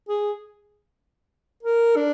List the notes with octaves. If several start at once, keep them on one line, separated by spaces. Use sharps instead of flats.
G#4
A#4
D4